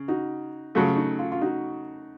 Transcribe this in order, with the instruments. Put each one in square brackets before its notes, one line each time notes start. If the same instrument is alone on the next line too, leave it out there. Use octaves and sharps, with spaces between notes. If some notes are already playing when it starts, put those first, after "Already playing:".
Already playing: [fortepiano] C#3
[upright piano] D#4 F#4
[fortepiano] C#3 F#3 A3 [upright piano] F4
[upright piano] D#4
F4
F4
D#4 F#4